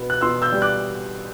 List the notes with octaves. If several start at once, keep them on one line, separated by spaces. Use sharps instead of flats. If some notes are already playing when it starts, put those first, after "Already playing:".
Already playing: B2 B3
F#6
B2 C6 E6
E6 G6
G3
D6 F#6